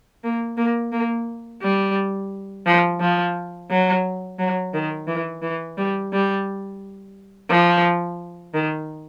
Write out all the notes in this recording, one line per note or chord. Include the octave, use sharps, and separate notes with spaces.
A#3
A#3
A#3
G3
F3
F3
F#3
F#3
D#3
E3
E3
G3
G3
F3
D#3